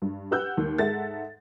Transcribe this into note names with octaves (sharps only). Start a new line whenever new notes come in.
G2
G4 B4 F#5 E6 F#6 G6
D#2
G#2 G#3 A4 E5 F#5 A6